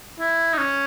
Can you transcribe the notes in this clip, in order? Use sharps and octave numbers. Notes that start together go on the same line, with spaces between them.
E4
D#4
C#4